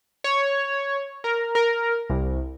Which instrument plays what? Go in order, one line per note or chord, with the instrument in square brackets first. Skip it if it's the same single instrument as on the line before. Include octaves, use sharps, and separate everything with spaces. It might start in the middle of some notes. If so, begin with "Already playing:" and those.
[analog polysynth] C#5
A#4
A#4
C2